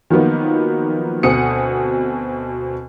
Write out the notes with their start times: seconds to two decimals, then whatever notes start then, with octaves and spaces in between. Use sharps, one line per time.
0.10 D#3 F3 F#3 A#3 B3 D#4
1.23 D2 B2 C4 F#5 D#6 C#7